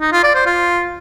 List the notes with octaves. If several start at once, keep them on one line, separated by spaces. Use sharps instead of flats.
D#4
F4
D5
C5
F4